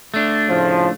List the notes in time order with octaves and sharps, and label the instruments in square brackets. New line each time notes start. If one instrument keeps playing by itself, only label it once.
[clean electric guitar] A3 D4
[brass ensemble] A2 C#3 F3